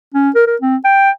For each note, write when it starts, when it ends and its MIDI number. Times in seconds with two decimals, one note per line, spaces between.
0.14 0.30 61
0.35 0.42 70
0.47 0.56 70
0.61 0.76 60
0.85 1.10 79